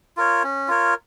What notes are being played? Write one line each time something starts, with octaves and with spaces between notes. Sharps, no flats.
F4 A#4 C#5
C#4
F4 A#4 C#5